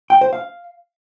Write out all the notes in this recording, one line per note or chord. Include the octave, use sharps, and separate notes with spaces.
G5
C5
F5